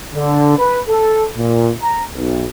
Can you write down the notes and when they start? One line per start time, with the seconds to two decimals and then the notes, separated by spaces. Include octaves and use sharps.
0.14 D3
0.58 B4
0.88 A4
1.36 A#2
1.82 A#5
2.14 B1